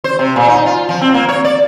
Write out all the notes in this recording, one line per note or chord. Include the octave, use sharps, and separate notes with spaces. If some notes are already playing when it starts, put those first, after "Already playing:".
C5
C3
A#2
D#4
F4
F3
C4
A#3
C#5
D5